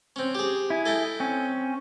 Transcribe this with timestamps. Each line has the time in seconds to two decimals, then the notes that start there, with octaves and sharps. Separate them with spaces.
0.16 C4 C#4
0.35 G4 G#4
0.70 E4 G#4
0.86 A4 D#5 G5
1.20 C4 C#4